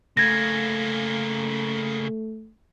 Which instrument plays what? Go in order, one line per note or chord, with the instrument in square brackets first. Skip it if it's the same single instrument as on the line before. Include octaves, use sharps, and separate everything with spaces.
[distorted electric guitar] C#3 A#3 [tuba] A3 [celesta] G#6 A#6